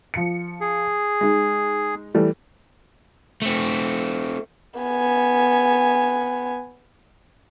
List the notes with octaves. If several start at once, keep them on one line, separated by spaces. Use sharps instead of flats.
F3 C#7
G#4
G#3 D#4
E3 G3 A3
A3 C4
B3 G#5